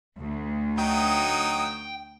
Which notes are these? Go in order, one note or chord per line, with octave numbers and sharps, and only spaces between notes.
D2
F#3 D#4 G5 D#6